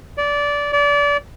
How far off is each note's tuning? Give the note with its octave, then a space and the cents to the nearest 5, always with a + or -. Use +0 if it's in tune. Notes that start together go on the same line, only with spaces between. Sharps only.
D5 -20
D5 -30